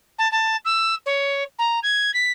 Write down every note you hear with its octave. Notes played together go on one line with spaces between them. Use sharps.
A5
A5
E6
C#5
A#5
G#6
B6